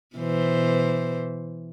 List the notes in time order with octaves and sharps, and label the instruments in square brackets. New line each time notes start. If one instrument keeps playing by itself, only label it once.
[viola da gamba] B2 E3 C5